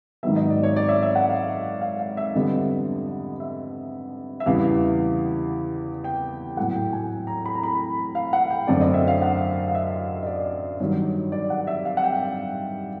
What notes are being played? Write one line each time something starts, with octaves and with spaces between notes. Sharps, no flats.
G#2 D#3 F#3 B3 E5
D#5
D5
C#5
D5
E5
E5
F#5
F5
F5
F5
E5
F2 D3 G3 B3 D#5
E5
E5
E2 C#3 E3 G3 B3 F5
G5
A2 F#3 A3 F#5
G5
G#5
A#5
B5
A#5
B5
F5
F#5
G5
F#2 D3 F#3 A3 C4 D5
D#5
E5
F5
F#5
F5
E5
D#5
D5
G2 D#3 F#3 C#5
D5
F#5
E5
F5
F#5
G5